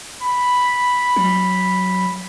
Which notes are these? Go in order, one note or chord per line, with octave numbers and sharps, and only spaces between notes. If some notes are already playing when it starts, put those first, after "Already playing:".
B5
F#3